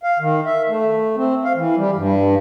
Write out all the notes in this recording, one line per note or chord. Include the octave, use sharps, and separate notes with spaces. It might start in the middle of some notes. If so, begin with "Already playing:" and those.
F5
D#3
E5
A3
C4
F5
E3
G3
G2